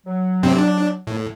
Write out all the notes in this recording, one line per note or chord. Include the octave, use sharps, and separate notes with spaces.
F#3
G2 C3 C4
D4
A2